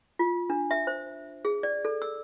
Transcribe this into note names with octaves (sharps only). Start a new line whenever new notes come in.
F4
D4
E5
C5
G#4
D5
A4
E6